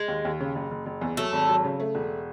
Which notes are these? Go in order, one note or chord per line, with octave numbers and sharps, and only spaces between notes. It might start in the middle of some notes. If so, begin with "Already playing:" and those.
Already playing: G#3
D#2
D#2
C#3
F#1
F#1
F#1
E2
F#3 A3
G#1
F#3
C#3
A3
E1